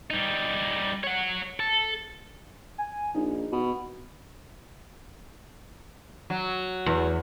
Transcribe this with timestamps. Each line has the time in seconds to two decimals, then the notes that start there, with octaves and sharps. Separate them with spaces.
0.10 G3 D#4
1.04 C#5 F#5
1.60 A4
2.78 G#5
3.15 A#1 D#4
3.52 B2
6.30 F#3
6.86 E2